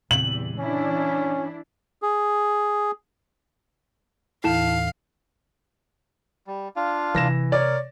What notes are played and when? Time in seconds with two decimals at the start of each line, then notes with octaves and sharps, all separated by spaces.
0.11 E2 A#2 C#3 G3 C4 F#7
0.59 E3 C#4 D4 E4
2.02 G#4
4.44 D#2 A2 E3 E4 F5 A5 E7
6.47 G3
6.76 D4 F4 F5
7.15 C3 E3 A#6 E7
7.52 A#4 C#5 D5